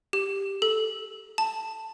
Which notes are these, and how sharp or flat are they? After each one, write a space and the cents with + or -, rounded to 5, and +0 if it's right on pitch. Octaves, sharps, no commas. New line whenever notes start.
G4 +5
A4 -5
A5 +10